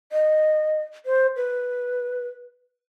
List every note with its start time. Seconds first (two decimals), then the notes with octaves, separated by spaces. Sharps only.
0.12 D#5
1.06 C5
1.36 B4